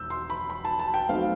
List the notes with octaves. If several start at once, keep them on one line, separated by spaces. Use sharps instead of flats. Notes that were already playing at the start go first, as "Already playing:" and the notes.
Already playing: E1 E6 G6
C6
B5
B5
A5
A5
G5
B1 B2 A3 C4 F5